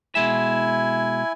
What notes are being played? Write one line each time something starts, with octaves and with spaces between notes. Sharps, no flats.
B2 G#3 E4 E5 G#5